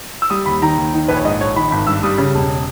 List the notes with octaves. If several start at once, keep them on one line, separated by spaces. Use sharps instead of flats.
E6
G3 D#6
D#2 B5
D#3 A#5
D#2
D#3
A#1 B4
C#5
G#2 D#5
A#1 C#5
D#3 B5
G#1 B5
G2 E6
G3 D#6
C#3
E1